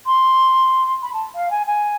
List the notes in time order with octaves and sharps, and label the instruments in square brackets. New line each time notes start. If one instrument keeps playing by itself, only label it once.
[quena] C6
B5
A5
F5
G#5
G#5